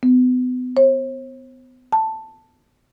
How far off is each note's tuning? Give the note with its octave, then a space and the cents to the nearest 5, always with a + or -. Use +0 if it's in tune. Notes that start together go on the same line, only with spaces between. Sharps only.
B3 +35
C5 +45
A5 +5